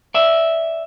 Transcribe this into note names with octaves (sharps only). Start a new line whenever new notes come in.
D5 E5